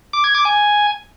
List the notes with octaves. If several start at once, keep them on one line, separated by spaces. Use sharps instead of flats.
D6
G#6
D6
G#5